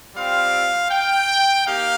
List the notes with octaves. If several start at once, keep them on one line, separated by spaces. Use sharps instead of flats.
G3 C4 F4 F5
G5
A#3 D#4 G4 F5